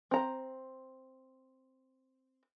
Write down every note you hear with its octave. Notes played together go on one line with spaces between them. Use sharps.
C4 A#5